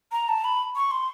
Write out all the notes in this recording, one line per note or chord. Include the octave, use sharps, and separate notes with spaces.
A#5
A5
B5
C#6
C6